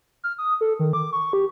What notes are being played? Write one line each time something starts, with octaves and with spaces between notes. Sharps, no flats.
F6
D#6
A4
D#3
D6
C#6
G4